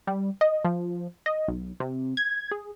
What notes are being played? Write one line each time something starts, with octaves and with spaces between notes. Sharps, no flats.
G3
D#5
F3
D#5
B1
C3
G#6
G#4